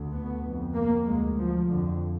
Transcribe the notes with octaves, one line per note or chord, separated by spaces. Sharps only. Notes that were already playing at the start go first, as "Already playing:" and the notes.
Already playing: D2
B3
F2
A#3
D2 G#3
F3
F2 D3